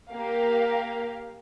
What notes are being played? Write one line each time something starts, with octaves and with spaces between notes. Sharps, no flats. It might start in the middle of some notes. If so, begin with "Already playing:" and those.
A#3 G4 A#4 F5